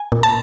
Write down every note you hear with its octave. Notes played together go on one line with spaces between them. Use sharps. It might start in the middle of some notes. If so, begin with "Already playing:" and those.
Already playing: G#5
A#2
A5